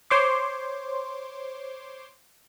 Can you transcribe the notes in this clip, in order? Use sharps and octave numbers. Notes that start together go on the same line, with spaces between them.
C5 C#5 C6 D6